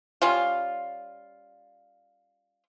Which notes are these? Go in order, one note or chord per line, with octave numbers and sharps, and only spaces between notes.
G3 C#4 F4